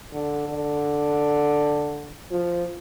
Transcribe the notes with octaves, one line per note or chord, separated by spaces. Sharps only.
D3
D3
F3